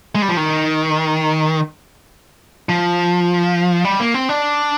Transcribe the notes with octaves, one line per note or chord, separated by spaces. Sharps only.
G#3
G3
F3
D#3
F3
G3
A#3
C4
D4